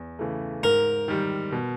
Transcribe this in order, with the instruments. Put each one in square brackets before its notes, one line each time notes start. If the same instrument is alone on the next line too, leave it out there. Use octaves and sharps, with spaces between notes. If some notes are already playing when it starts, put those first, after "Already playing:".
Already playing: [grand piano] E2
C#3 E3 A3
[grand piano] G#2 [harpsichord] A#4
[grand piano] D#3 G3
B2